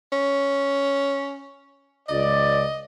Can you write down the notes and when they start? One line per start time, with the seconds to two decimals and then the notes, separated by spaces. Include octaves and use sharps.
0.12 C#4
2.09 C#2 D5 D#5